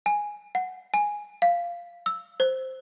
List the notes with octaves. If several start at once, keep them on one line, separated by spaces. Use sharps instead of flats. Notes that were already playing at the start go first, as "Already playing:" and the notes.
G#5
F#5
G#5
F5
E6
C5